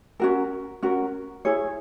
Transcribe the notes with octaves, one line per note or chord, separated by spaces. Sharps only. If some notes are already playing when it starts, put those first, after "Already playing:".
C#4 F#4 A#4
C#4 F#4 A#4
E4 G#4 C#5